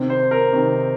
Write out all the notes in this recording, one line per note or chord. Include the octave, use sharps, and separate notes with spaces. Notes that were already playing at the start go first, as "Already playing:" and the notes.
Already playing: C3 D#3 C4
C5
A#4
C3 D#3 C4